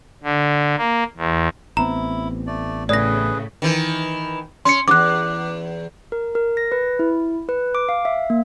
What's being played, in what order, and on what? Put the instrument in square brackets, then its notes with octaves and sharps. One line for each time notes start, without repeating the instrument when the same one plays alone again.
[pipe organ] D3
A#3
E2
[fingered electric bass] A1 B3 C4 [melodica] E4 [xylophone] A#5
[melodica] A3 D5
[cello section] A2 C#3 [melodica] G#4 B4 [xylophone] D5 A#6
[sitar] D#3 E3
[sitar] C#4 [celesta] C6 C#7
[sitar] E2 G2 [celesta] D6 F#6
[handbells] A#4
A#4
A#6
B4
E4
B4
D6
F5
E5
A#3